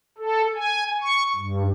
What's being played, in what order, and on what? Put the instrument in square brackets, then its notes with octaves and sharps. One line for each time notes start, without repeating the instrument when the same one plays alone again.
[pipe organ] A4
G#5
C#6
G2